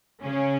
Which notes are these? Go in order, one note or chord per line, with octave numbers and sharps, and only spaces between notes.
C#3 C#4